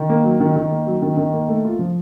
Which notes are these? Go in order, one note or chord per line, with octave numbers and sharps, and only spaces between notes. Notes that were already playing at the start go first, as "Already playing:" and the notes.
Already playing: D#3
A#3
F#3
D#3
D#3
A#3
F#3
D#3
D#3
A#3
A3
F4
F3